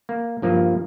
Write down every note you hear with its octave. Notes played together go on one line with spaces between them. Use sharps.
A#3
G2 F3 A#3